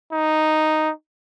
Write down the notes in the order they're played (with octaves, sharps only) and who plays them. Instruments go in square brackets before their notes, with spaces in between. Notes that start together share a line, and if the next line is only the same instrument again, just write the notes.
[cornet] D#4